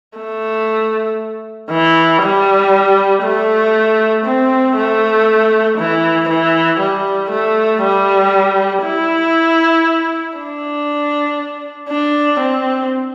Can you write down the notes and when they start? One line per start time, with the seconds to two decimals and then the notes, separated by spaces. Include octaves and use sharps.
0.18 A3
1.71 E3
2.22 G3
3.23 A3
4.26 C4
4.76 A3
5.78 E3
6.29 E3
6.80 G3
7.31 A3
7.82 G3
8.84 E4
10.37 D4
11.89 D4
12.40 C4